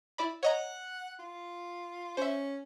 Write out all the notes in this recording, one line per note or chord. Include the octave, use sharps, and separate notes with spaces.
E4 D5 B5
C#5 D#5 F#5 A#5
F4
C#4 C5 E5